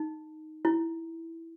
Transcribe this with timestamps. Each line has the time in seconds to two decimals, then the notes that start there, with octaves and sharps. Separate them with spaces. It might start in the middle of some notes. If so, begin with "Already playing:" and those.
Already playing: D#4
0.65 E4